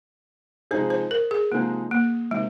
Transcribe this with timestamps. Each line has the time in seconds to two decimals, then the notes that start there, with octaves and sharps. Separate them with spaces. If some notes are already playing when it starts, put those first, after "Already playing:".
0.71 C3 F3 G#3 D#4 G#4 C5
0.90 C5
1.11 A#4
1.31 G#4
1.51 C3 F3 G#3 A#3 D#4 G#4
1.91 A#3
2.31 C3 D#3 G#3 A#3